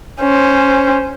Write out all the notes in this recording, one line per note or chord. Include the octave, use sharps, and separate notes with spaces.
C#4 C5